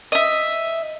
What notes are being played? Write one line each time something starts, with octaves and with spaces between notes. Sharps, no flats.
D#5 E5